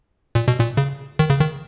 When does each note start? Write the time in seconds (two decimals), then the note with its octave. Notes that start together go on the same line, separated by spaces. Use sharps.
0.35 A#2
0.48 B2
0.60 A#2
0.77 C#3
1.19 D#3
1.30 C#3
1.40 D#3